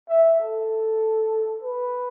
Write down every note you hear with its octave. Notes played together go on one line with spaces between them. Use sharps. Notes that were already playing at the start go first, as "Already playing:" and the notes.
E5
A4
B4